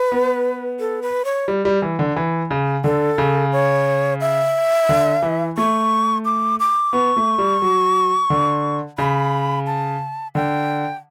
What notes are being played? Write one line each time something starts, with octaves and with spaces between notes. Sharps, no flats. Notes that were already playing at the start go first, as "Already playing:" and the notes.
Already playing: B4
B3
A4
B4
C#5
G3
G3
E3
D3
E3
C#3
D3 A4
C#3
C#5
E5
D3
E3
A3 C#6
D6
D6
B3 C#6
A3
G3
F#3
D3
C#3 B5
A5
D3 G5